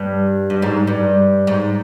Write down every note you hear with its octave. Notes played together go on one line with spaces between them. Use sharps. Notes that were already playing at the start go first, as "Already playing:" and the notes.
Already playing: G2
G2
G#2
G2
G#2